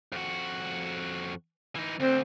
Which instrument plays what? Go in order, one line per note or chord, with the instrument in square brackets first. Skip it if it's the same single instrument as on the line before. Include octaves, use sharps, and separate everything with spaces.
[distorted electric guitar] F2 F#4
E3 D#4
[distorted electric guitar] D2 [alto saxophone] C4